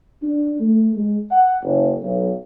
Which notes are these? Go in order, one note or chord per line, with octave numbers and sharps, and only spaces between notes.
D4
A3
G#3
F#5
F#1
B1